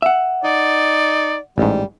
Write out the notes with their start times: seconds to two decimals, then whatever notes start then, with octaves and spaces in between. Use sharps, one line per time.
0.02 E5 F#5
0.44 D#4 D5
1.58 A1 G#2 G3